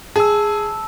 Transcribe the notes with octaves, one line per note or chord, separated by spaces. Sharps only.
G#4 A5 E6